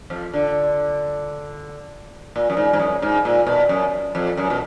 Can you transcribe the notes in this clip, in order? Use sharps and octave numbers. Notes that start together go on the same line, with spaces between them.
F2 F3
D3
A#2
F#2
G#2
G#2
F#2
G#2
A#2
B2
F#2
F2
F#2
B2